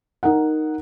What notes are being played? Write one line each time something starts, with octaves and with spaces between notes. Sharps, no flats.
D#4 A#4 F#5